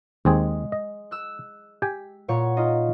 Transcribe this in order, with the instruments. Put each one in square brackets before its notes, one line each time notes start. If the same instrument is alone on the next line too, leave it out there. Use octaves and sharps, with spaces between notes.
[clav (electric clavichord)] D#2 C4 G#4 [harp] G#3
[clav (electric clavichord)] D#5
[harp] E6 F#6
[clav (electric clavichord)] G4 G5 G#5 [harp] B6
[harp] A#2 C#5 F#5
D#4 F4 D#5